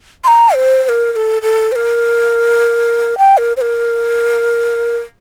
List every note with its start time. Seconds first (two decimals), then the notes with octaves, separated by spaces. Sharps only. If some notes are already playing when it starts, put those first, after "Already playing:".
0.24 C6
0.27 A#5
0.54 C5
0.84 C5
0.89 A#4
1.12 A#4
1.16 A4
1.42 A4
1.72 C5
1.75 A#4
3.18 G5
3.37 A#4
3.57 C5
3.61 A#4